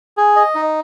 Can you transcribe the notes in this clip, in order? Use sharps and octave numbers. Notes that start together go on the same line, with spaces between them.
G#4
D#5
D#4